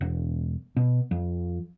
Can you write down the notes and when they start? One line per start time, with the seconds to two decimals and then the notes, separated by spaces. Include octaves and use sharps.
0.01 E1
0.76 B2
1.11 F2